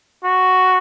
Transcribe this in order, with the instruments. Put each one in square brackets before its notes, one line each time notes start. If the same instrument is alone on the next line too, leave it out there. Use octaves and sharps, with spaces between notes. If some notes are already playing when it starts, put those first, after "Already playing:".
[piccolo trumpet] F#4